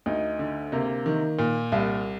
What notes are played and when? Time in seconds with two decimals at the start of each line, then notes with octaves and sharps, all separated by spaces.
0.06 D2 D#4
0.39 D3
0.72 C3 A#3
1.06 D#3
1.39 A#2
1.72 C2